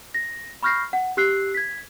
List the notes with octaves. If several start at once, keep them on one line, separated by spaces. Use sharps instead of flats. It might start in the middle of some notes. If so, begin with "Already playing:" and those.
A#6
B5 C#6 F6 G6 A#6 C7
F#5
G4 E6 F#6 C7
G#6 B6